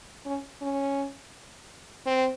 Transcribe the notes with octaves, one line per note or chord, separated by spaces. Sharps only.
C#4
C#4
C4